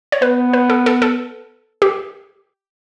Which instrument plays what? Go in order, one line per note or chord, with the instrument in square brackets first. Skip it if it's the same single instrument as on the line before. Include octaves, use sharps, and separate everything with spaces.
[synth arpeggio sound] C#5
[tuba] B3 [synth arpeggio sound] B4
[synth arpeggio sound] B4
A4
A4
A4
G4